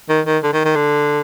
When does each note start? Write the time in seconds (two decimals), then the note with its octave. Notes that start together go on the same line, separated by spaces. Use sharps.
0.09 D#3
0.26 D#3
0.43 D3
0.53 D#3
0.65 D#3
0.76 D3